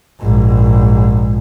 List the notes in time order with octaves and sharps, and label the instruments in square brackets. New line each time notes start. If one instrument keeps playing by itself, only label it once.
[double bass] A#1 G#2